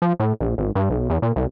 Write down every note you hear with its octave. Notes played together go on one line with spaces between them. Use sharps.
F3
A2
A#1
G#1
G2
B1
E2
A#2
C2